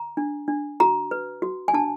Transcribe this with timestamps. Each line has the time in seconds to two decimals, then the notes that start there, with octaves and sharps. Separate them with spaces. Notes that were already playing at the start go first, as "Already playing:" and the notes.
Already playing: A#5
0.17 D4
0.48 D4
0.80 F#4 A#5
1.11 B4
1.42 F#4
1.68 G#5
1.74 D4 A5